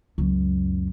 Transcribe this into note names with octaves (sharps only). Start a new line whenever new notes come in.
C#2 F#2